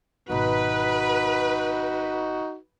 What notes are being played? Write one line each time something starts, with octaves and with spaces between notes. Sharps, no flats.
G#1 B2 D#4 F#4 B4